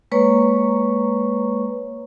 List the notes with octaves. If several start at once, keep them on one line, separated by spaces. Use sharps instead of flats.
G#3 A#3 B4 C#5 A#5 C#6